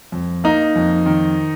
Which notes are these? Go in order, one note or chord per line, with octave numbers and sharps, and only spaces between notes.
F2
A#3 D#4
F2
D#3